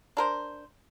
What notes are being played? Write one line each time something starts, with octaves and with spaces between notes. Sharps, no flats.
D4 A#4 C5